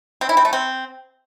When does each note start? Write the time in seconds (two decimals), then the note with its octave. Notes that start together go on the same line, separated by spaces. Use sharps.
0.21 C4
0.29 E4
0.37 C4
0.45 A3
0.53 C4